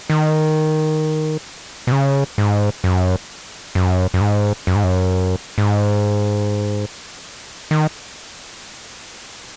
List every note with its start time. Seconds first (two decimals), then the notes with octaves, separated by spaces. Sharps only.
0.10 D#3
1.87 B2
1.92 C#3
2.38 G#2
2.84 F#2
3.75 F#2
4.14 F#2
4.21 G#2
4.67 F#2
4.75 G#2
4.84 F#2
5.58 G#2
7.71 D#3